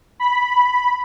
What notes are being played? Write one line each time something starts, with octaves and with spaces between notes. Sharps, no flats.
B5